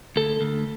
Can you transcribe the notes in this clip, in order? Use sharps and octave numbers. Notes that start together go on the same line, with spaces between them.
D2 A4
D2